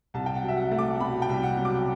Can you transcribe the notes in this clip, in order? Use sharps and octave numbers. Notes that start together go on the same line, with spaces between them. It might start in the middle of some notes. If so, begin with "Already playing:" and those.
C2 A5
G5
F#5
F#3
E5
F#5
A3
D6
B2 B5
G5
C2
F#5
F#3
D6